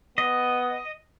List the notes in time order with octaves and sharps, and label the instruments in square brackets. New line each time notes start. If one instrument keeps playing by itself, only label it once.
[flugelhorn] B3 [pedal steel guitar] D#5